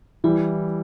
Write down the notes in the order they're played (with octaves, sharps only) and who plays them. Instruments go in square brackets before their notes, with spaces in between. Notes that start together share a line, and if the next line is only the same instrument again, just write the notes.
[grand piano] E3 G3 [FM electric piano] E4